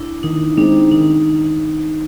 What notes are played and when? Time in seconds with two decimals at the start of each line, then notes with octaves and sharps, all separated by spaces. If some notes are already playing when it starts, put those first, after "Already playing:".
Already playing: D4 E4
0.23 D#3 D#4
0.57 G#3 C4 D4 D#4
0.91 D#3 D#4